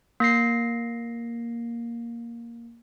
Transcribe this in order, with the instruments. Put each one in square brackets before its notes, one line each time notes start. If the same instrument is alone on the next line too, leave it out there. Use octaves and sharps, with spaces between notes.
[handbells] A#3 A#6 C7